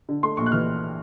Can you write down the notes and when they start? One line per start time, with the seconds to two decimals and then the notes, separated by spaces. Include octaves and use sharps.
0.09 D3
0.23 A3 C6
0.37 A#1 C#6
0.46 F#6
0.52 E3 F6